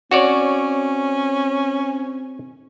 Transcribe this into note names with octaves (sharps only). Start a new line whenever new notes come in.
C4 C#4 F#4 C#5 D5